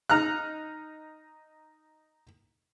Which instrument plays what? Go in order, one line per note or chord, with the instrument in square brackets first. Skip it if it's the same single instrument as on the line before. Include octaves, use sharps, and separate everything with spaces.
[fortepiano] D#4 A#5 F6 F#6